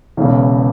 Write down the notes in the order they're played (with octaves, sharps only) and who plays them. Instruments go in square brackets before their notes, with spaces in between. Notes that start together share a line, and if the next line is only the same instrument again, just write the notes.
[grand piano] E1 E2 C#3 E3